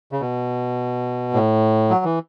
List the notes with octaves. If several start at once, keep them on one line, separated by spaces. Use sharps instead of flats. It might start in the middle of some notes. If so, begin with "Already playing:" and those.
C#3
B2
A2
F#3
E3